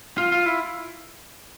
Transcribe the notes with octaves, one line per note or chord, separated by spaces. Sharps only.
F4
F4
E4